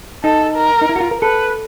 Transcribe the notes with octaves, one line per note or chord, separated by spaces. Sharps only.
D#4 A4
A#4
D#4
E4
F#4
F4
A#4
A4 B4